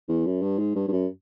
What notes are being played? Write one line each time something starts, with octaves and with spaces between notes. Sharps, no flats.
E2
F#2
G2
G#2
G2
G2
F#2